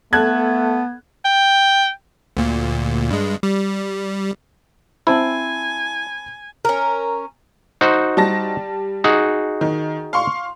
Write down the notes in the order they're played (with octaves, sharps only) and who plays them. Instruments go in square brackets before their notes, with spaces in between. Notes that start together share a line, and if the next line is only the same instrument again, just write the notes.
[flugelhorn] A3 [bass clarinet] B3 [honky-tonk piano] A4 F#6 G#6
[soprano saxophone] G5
[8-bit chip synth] D2 A#2
G2 G#3
G3
[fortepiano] C4 A5 B5 [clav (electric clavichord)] E4 [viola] G#5
[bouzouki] C#4 A#4
[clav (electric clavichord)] D#4 F#4 C5
[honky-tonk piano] G3 A5 A#6
[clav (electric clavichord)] D#4 F#4 G#4
[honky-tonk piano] D#3
F5 C6 C#6